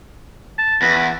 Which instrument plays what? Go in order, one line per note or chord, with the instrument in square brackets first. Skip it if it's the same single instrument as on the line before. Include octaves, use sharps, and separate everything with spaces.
[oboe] A5
[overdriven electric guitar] E2 [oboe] B4